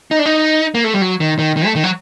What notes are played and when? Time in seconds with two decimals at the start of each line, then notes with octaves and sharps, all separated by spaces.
0.11 D#4
0.19 D4
0.26 D#4
0.75 A#3
0.84 A3
0.93 G3
1.02 F#3
1.20 D#3
1.39 D#3
1.57 D#3
1.66 A3
1.76 D#3
1.84 F#3